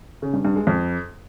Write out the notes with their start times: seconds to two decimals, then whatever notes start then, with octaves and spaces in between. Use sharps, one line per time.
0.22 C#3
0.33 G2
0.45 G2
0.56 G#3
0.67 F2